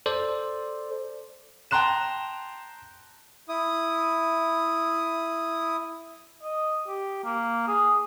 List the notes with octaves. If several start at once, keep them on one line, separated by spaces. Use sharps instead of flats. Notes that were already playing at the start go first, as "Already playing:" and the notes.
A4 C5 D5
G5 A5 A#5 C6 F#6 E7
E4 D#6
D#5
G4
A#3
G#4